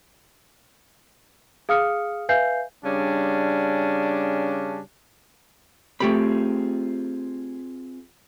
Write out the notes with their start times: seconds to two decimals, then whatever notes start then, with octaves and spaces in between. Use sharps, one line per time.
1.69 G#4 F5 D#6 F6 C#7
2.29 B4 E5 F5 G#5 G6 C7
2.85 C#3 G3 C#4 D4
6.00 A3 C4 F4 G4 G#4 B5